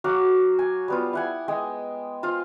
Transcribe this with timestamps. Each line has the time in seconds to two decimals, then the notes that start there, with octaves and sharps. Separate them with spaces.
0.04 F#3 F#4 F5 D6
0.59 G#5
0.88 G3 B3 F4
1.13 E4 F#5 G#5
1.48 G#3 D#5 G5 G#5
2.23 F4 C5 F5